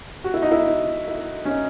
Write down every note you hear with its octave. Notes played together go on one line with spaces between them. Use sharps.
F#4
E4
D#4
E4
D#4
E4
C#4
D#4